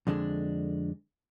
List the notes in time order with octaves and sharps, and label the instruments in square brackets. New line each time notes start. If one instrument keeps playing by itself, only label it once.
[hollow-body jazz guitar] F2 D3 G#3 D4